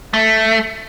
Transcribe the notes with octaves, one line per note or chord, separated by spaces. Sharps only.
A3